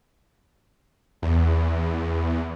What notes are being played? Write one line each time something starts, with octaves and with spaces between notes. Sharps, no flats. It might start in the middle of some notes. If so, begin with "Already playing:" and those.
E2